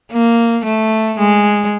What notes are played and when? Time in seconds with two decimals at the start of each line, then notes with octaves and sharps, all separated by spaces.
0.12 A#3
0.65 A3
1.19 G#3